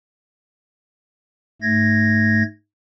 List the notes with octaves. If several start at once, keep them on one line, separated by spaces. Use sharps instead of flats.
G#2 A3 G#6 A#6